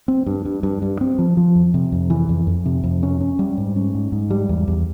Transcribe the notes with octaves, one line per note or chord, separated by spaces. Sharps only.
C4
G2
G2
G2
G2
C4
F3
F3
F2
C3
F2
E3
F2
F2
C3
F2
C#4
C#4
G3
G#2
C#4
G#2
G#2
G3
E2
E2